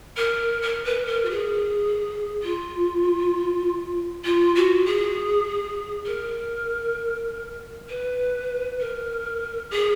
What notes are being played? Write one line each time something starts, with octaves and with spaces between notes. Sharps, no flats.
A#4
A#4
B4
A#4
F#4
G#4
F4
F4
F#4
G#4
A#4
B4
A#4
G#4